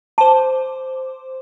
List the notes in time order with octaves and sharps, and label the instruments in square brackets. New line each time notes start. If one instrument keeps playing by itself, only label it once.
[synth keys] C5 D6 [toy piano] A5